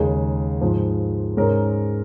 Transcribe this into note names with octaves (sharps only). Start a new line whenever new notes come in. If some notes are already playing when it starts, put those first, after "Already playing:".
Already playing: D#2 C#3 G#3 D#4 G#4
G#2 F3 G#3
G#2 G#3 C#4 A#4